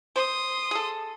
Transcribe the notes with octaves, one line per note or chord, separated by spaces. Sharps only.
C5 C6 D#6
G#4 A4